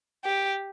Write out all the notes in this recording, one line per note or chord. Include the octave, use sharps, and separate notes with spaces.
G4